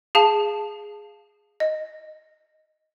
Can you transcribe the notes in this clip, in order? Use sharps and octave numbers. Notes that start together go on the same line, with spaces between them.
G#4 F5 A5
D#5